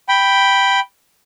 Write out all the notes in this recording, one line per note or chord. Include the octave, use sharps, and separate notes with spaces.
G5 B5